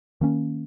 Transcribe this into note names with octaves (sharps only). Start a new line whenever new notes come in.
D#3 A#3 C#4